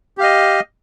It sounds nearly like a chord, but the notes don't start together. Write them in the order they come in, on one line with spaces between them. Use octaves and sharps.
G4 F5 D#5